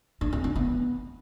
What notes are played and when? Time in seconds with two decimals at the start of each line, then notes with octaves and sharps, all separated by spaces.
0.21 D4
0.33 C4
0.44 D4
0.56 B3